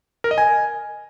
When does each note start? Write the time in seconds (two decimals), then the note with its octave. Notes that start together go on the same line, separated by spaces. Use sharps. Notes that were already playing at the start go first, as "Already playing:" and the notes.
0.24 A#4
0.31 D#5
0.38 G#5